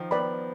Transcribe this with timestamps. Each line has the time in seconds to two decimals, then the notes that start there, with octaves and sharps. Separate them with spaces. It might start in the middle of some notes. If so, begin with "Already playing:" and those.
Already playing: D#3 F3
0.11 B3 B4 D5 G5 B5